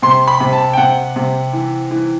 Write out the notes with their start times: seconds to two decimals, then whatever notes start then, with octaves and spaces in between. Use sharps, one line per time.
0.02 C3 C6
0.28 B5
0.40 C3
0.53 A5
0.73 G5
0.77 C3 F#5
1.16 C3
1.53 E3
1.91 E3